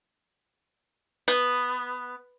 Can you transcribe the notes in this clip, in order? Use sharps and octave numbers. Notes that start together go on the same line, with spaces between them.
B3